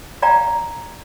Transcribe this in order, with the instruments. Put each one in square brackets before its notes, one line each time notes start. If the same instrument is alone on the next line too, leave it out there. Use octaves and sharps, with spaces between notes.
[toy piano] D5 F5 G5 A#5